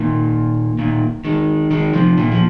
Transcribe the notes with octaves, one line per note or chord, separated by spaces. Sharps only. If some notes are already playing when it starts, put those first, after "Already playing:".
Already playing: A#2 D#3
A#2 D#3
D#3 G#3
D#3 G#3
C3 F3
A#2 D#3
F3